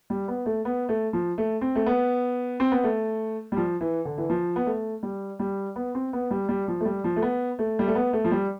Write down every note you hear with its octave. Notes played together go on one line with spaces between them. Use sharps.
G3
B3
A3
B3
A3
F3
A3
C4
A3
B3
C4
B3
A3
G3
F3
E3
D3
E3
F3
B3
A3
G3
G3
B3
C4
B3
G3
G3
F3
A3
G3
F3
A3
B3
A3
G3
A3
B3
A3
F3
G3